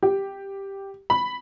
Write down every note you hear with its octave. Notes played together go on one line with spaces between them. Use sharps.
G4
B5